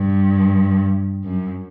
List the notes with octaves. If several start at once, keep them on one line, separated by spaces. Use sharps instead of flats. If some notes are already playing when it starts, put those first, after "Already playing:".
Already playing: G2
F#2